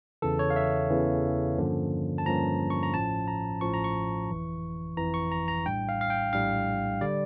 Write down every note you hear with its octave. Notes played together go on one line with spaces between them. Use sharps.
E2 C#3 E3 A4
C#5
F5
E5
E2 C#3 E3
G2 D3 F3 A#3 C#4
A5
G2 D3 F3 A#3 C#4 A#5
C#6
A#5
A1 A2 F3 C#4 A5
A#5
A1 A2 F3 C#4 C#6
A#5
C#6
G1 F2 E3
G1 F2 E3 A#5
C#6
A#5
A#5
A#1 A2 G3 D4 G5
F5
F5
G5
A#1 A2 G3 D4 F5
D3 G3 D5